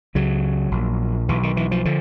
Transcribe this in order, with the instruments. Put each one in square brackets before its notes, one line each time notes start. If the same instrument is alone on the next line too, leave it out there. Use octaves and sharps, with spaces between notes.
[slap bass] C#2 C#3 F#3
A#1 A#2
B1 B2 E3
D#3
E3
F3
D3 F3